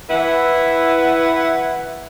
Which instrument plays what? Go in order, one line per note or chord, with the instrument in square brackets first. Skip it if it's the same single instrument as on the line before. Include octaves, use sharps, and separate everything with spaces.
[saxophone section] E3 E4 B4 F#5